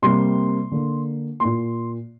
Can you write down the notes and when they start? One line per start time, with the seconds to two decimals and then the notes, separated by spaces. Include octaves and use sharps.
0.02 C3 G3 A#3 C6
0.71 D3 A#3
1.40 A#2 A#3 C6